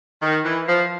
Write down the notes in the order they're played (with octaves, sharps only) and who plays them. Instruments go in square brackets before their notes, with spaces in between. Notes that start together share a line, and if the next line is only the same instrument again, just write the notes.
[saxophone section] D#3
E3
F3